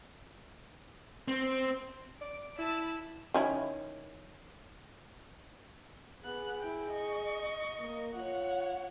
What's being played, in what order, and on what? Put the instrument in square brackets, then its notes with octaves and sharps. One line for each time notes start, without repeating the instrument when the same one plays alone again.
[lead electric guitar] C4
[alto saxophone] D5 [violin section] D7
[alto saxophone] E4 [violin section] A5 B5 E6
[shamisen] D#3 C#4 E4
[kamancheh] B3 F#6 [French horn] G#4
[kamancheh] E4 G5
D#5 C#6
[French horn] A#3
[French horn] F4 [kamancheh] C#5 F#5